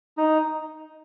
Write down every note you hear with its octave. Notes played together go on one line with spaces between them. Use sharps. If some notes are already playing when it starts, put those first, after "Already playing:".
D#4